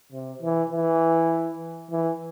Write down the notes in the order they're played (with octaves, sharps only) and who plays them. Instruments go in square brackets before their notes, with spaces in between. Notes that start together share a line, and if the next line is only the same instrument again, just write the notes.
[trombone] C3
E3
E3
E3